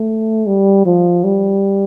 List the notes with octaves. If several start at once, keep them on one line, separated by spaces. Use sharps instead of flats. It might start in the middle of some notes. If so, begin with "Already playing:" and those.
Already playing: A3
G3
F3
G3